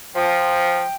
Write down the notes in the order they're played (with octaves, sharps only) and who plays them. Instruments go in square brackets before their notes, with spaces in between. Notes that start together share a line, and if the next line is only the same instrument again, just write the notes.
[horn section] F3 [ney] G5